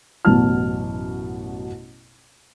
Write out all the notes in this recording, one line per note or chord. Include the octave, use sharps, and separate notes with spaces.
A1 F#2 B2 A5 F6